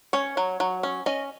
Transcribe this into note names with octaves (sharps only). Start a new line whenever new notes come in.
C#4 C#5
F#3
F#3
C#4
C#4 D#5